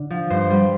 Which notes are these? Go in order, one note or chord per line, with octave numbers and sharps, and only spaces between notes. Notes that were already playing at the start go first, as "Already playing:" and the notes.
Already playing: D3
F3
G2 C5
G3